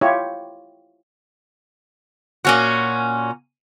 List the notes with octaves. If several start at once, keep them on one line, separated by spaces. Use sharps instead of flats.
E4 F4 G4 C#5
A#2 C#4 F#4